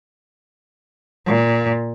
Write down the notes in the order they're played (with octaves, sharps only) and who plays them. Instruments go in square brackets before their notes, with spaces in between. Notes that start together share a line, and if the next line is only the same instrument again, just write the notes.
[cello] A#2